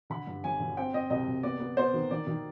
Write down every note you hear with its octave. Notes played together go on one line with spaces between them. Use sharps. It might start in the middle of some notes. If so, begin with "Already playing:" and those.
D3 B5
G2
G1 G#5
D3
C4 G5
C4 D#5
C2 D#5
C2
B3 D5
B3
B3 C5
D#3
D#3 D5
D#3